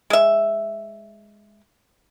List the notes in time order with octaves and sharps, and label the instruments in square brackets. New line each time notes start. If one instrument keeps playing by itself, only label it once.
[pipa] G#3 E5